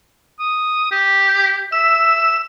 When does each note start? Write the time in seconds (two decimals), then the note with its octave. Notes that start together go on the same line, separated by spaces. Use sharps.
0.39 D#6
0.91 G4
1.72 E5 E6